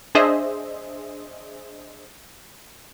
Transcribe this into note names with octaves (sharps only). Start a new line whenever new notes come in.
D4 G#4 C5 D#5 E5